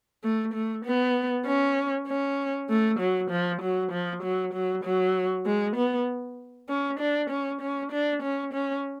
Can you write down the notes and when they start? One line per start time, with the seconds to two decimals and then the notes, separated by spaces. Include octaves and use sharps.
0.24 A3
0.54 A3
0.85 B3
1.46 C#4
2.08 C#4
2.69 A3
2.99 F#3
3.30 F3
3.62 F#3
3.91 F3
4.23 F#3
4.53 F#3
4.84 F#3
5.46 G#3
5.76 B3
6.69 C#4
6.99 D4
7.30 C#4
7.61 C#4
7.92 D4
8.22 C#4
8.53 C#4